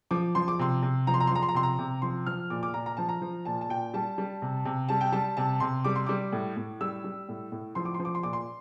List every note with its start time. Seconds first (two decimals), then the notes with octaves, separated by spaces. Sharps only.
0.11 F3 D6
0.35 F3 C6
0.48 D6
0.59 C3 C6
0.82 C3
1.07 F3 A#5
1.14 C6
1.20 A#5
1.27 C6
1.31 F3 A#5
1.43 C6
1.49 A#5
1.54 C3 C6
1.63 A#5
1.78 C3
2.02 F3 C6
2.26 F3 F6
2.50 A#2 D6
2.63 D6
2.74 A#2 A#5
2.86 A#5
2.97 F3 A5
3.09 A#5
3.21 F3
3.45 A#2 A5
3.61 A5
3.69 A#2 G5
3.94 G3 A5
4.18 G3
4.42 C3
4.65 C3
4.89 G3 A5
5.01 G5
5.12 G3 A5
5.37 C3 A5
5.60 C3 C6
5.84 G3 D6
5.96 C6
6.07 G3 D6
6.32 A2
6.57 A2
6.81 G3 E6
7.04 G3
7.29 A2
7.52 A2
7.75 F3 C6
7.85 D6
7.94 C6
7.99 F3
8.05 D6
8.15 C6
8.23 A#2 D6
8.33 C6